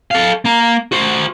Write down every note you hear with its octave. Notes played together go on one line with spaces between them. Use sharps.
A4 F5
A#3 A#5
F#4 C5